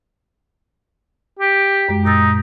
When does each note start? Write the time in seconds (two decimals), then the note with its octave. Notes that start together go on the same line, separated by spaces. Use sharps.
1.39 G4
1.89 F#2 G#3
2.05 A#2 D#4 E6 A6